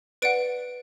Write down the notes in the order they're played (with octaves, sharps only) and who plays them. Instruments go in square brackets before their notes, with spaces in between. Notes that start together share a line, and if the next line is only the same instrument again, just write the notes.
[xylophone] B4 D5 F#5 D7